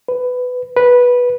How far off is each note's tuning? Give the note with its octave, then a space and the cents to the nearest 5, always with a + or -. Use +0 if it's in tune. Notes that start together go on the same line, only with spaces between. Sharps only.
B4 +15
B4 -10